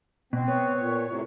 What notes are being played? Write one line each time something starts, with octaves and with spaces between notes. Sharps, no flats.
B2 C4
B3 C#5
A#2
A2 C3